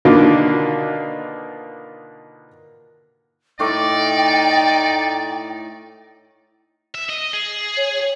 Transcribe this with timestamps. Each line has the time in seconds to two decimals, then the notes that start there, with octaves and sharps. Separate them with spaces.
0.05 B2 D3 D#3 A#3 D4 F4
3.60 A2 D#4 D5 G5 D6
6.94 E5
7.09 D#5
7.34 G#4
7.77 C#5
7.93 C#5